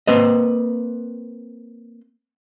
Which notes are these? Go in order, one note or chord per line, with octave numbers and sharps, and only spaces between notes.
A#3 C4 B4 D#5